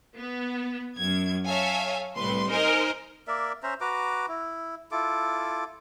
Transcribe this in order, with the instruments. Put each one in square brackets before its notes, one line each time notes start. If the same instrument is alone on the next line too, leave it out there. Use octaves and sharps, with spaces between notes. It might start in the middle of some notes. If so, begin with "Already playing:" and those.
[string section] B3
F#2 G#6
A4 C#5 E5 F5 G#5
C2 A2 B4 C6
D#4 A#4 C5 D#5 G#5
[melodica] A#3 A#4 D5 E5
C#4 C5 E5 A#5
F#4 B4 A#5 D6
E4
E4 F4 A4 D6